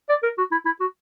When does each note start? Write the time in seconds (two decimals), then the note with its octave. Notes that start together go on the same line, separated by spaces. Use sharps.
0.09 D5
0.23 A#4
0.38 F#4
0.52 E4
0.65 E4
0.80 F#4